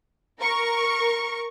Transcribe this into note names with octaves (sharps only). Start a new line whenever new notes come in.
A#4 C#6